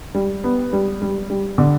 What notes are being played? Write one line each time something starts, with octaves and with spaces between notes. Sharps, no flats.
G3
B3
G3
G3
G3
D3